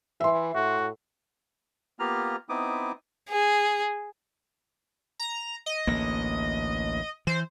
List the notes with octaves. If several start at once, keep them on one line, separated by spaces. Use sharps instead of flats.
E3 E5 C6
A2 F#4
A#3 B3 F4 G4 A#5 F6
B3 C4 D#4 E4 D6 D#6
G#4
A#5
D#5
A1 D2 A#3
E3 C5